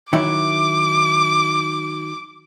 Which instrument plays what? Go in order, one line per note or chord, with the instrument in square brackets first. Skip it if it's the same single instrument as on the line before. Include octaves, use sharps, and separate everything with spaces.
[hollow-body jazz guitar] D#3 F#3 E4 [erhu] D6